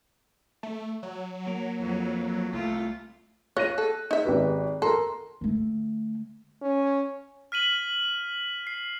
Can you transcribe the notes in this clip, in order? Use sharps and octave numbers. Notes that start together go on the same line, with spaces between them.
A3
F#3
A#3 A#4
F2
C2 A3 F4
F4 C#5 F#6 A#6 D#7
A4
D#4 E5
G#1 G4 B4
A4 A#4 A#5 C6
D3 A3
C#4
F6 B6 D#7 F#7
C7